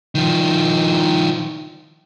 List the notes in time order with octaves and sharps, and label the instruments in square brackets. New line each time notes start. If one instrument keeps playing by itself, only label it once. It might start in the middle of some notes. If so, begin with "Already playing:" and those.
[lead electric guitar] D#3 F3